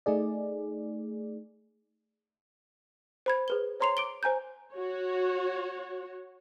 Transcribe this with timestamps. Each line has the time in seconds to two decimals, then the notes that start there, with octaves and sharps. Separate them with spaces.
0.06 A3 D#4 G#4 D5
3.26 C5 B5 G#6
3.48 G#4 B4 G7
3.80 C5 C#5 A#5 C6 C7 F7
3.97 D6 D7 G7
4.23 C5 G#5 A#5 G6
4.73 F#4 C#5